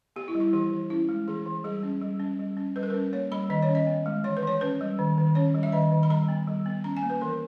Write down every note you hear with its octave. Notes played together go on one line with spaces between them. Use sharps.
B3 G4
E4
G3
E4
E3 G4
E3
C#4 E4
G#3
E3 G#4
E3
G3 G#4
C#4
G3
C#4
G3
C#4
G3 B4
A#4
C#4 B4
A#3 C#5
G3 B5
D#3 D#5
C#5
C#4
D#5
B3
G#3
E3 C#5
B4
E3 C#5
C#4 B4
G3
D#3
D#3
C#4 C#5
G3
E5
D#3 D#5
D#3
B5
G3 A#5
B3
G3
B3
C#4 A#5
G#5
A#3
B4
E3 A#4